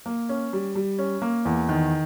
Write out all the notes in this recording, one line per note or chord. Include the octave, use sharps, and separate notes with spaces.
A#3
C#4
G3
G3
C#4
A#3
E2
D#3